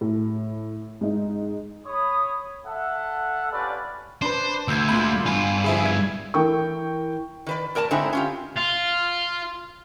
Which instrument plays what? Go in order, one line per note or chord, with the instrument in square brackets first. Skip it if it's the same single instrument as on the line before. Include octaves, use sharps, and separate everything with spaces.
[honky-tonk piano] A2
G#2 D#4
[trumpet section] C#5 B5 D#6
A4 E5 F#5
C#4 D4 F4 G4 B4 D5
[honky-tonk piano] D4 B4 [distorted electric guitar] C5
[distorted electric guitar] D2 [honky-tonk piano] E6 G6 G#6
[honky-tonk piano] A#2 G#3 B5
[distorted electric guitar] G2 F4 [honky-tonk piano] G#5 B5
[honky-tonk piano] F3 E4 G#4
G#6
[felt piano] E3 E4 A#4 G5 C#6
[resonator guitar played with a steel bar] D#3 B4 D5
A2 A#4 D5 G#5 A5
G#2 D3 C4 D#4 E4 G#5
C#4 F4 G4
[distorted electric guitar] F4